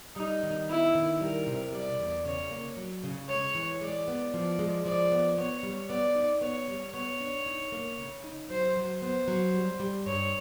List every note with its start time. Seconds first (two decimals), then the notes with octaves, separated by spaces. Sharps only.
0.16 G3 D#4
0.43 D#3
0.69 B3 E4
0.95 D#3
1.21 G3 A#4
1.47 C3
1.72 G3 D5
1.99 E2
2.25 C#3 C#5
2.51 A#3
2.77 F#3
3.04 C#3
3.29 G#3 C#5
3.55 E3
3.81 G#3 D5
4.08 B3
4.34 F3 D5
4.59 G#3
4.85 F3 D5
5.12 B3
5.38 B3 C#5
5.63 G3
5.89 B3 D5
6.15 D#4
6.42 B3 C#5
6.68 G3
6.93 B3 C#5
7.21 D4
7.46 D#4
7.72 A#3
7.98 C#3
8.24 D#4
8.50 F#3 C5
8.77 F#3
9.02 B3 C5
9.28 F#3
9.54 G3
9.80 G3
10.06 G2 C#5